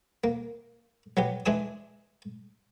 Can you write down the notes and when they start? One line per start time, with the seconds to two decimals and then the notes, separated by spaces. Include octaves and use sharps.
0.24 A#3
1.17 F#3 B3 G4
1.46 E3 G#3 D4 G#5 D#6